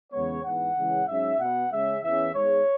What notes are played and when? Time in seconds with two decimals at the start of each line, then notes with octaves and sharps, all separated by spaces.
0.12 E2 C#3 G#3 B3 C#5
0.44 G#2 E3 B3 F#5
0.76 C#3 E3 G#3 C#4
1.07 G#2 F#3 C#4 E5
1.39 B2 B3 F#5
1.71 C#3 G#3 C#4 E5
2.03 E2 E3 C#4 E5
2.34 G#2 G#3 B3 C#5